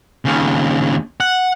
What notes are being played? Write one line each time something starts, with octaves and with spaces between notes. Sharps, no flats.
D#2 C#3
F#5